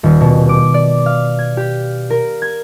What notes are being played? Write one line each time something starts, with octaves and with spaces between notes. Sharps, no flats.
D#1
B2
D6
D5
F5
G#6
G4
A#4
G#6